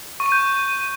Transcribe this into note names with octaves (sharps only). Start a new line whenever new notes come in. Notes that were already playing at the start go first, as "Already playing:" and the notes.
C#6
D#7
G6